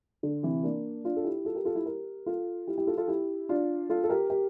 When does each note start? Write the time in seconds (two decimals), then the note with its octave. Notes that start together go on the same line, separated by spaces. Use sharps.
0.23 D3
0.43 C3 E3
0.63 A#3 D4
1.04 D4 F4
1.17 A4
1.24 E4 G4
1.45 F4 A4
1.55 G4 A#4
1.65 F4 A4
1.75 E4 G4
1.86 G4 A#4
2.26 F4 A4
2.67 E4 G4
2.78 E4 G4
2.87 F4 A4
2.97 F4 A4
3.08 E4 G4
3.49 D4 F4
3.89 F4 A4
4.04 A4
4.09 G4 A#4
4.30 G4 A#4